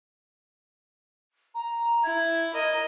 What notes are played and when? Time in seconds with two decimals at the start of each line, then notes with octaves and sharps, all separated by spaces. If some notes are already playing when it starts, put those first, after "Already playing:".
1.55 A#5
2.04 E4 G#6
2.54 A#4 D#5